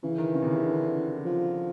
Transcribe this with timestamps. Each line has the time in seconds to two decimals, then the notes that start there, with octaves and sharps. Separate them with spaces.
0.03 C#3 E3
0.18 D#3
0.34 C#3
0.42 C3
0.48 C#3
0.64 D3
1.25 F3